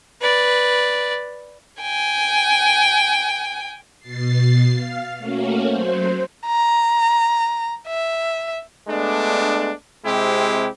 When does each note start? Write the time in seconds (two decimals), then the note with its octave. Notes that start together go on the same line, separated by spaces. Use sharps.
0.21 B4 D5
1.81 G5 G#5
4.00 B2 A6 C7
4.73 F5
5.18 A3 A#3 C#4 F#4
5.68 F#3 C5
6.47 A#5
7.88 E5
8.88 G#3 A3 B3 D4
10.06 C3 G#3 C4 E4 G4